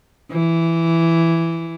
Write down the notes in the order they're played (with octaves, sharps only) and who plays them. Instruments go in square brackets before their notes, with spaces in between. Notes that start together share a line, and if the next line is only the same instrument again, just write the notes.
[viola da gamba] E3